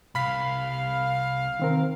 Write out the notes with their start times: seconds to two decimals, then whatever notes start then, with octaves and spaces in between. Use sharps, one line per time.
0.15 C2 F5 B5 B6
1.60 D#3 C4 A#4